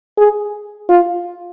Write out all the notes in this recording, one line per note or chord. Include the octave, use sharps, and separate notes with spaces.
G#4
F4